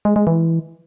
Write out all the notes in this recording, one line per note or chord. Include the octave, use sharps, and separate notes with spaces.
G#3
G#3
E3